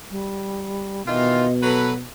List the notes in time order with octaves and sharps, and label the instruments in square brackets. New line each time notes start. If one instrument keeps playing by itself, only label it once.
[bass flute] G3
[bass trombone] B2 [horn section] D#3 E3 F4 [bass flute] D#5
[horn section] F#3 B4 [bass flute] A4